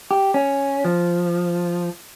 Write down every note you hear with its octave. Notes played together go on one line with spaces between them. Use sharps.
G4
C#4
F3